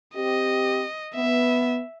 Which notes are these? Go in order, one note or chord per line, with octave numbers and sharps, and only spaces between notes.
C4 G4 D#5
B3 E5